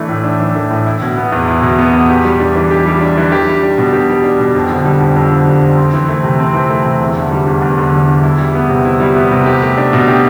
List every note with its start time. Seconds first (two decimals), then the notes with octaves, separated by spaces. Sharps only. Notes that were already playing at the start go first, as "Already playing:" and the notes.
Already playing: E3 A3 D4
0.09 A2
0.24 D4
0.40 E3
0.55 A3
0.70 A2
0.86 E4
1.02 B2
1.17 B3
1.32 E2
1.48 E4
1.62 B2
1.79 B3
1.93 E2
2.09 G4
2.25 G3
2.40 D4
2.56 E3
2.71 G4
2.85 G3
3.01 D4
3.17 E3
3.32 G4
3.47 G3
3.63 D4
3.78 B2
3.93 G4
4.09 G3
4.24 D4
4.40 B2
4.55 F2
4.70 D3
4.85 G3
5.01 F2
5.16 F2
5.32 D3
5.47 G3
5.62 F2
5.78 C4
5.93 E3
6.08 A3
6.24 C3
6.40 C4
6.54 E3
6.70 A3
6.86 C3
7.00 E2
7.17 D3
7.31 G3
7.46 E2
7.62 E2
7.78 D3
7.93 G3
8.08 E2
8.23 E4
8.39 G3
8.55 B3
8.69 C3
8.85 E4
9.00 G3
9.16 B3
9.31 C3
9.46 G4
9.62 A3
9.78 D4
9.93 B2
10.08 G4